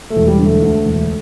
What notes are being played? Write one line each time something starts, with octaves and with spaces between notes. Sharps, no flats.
A3
E1
G3
D3
A3
D2
E1